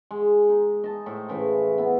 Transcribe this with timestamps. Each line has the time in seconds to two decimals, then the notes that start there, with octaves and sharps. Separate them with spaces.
0.11 G#3
0.49 D#4
0.84 D#5 A5
1.06 A2 C5
1.28 A2 C#3 E3 A3
1.78 B3 E4